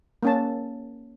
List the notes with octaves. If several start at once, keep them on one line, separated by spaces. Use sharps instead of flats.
A#3 C#4 A5